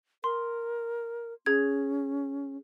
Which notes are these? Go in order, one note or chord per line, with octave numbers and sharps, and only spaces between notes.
A#4 C6
C#4 G#4 G#6